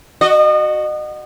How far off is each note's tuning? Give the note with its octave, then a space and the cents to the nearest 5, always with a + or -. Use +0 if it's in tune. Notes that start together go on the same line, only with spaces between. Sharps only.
F#4 +0 D#5 -35